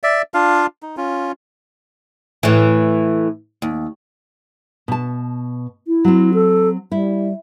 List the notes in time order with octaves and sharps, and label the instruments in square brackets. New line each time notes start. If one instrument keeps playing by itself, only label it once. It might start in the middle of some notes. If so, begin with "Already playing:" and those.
[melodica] D5 E5
D4 F4 F5
D#4
C#4 F4
[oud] A2 E3
D#2
[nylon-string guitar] B2 A5
[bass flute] E4
[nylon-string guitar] F#3 C4
[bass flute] A4
[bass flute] G3 [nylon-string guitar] E4